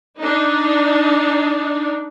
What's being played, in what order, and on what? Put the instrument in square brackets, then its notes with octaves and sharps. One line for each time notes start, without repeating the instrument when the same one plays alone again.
[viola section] D4 D#4